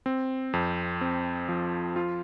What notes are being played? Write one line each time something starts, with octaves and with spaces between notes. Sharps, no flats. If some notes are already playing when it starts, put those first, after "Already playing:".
C4
F2
C4
F3
F4